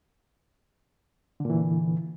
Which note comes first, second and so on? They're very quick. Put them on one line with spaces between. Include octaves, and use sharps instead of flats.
D3 A#2 E3